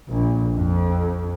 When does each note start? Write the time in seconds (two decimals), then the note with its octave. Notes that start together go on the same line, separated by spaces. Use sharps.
0.10 A#1
0.55 F2